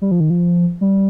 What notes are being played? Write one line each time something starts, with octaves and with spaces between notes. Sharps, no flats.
G3
F3
D#3
F3
G3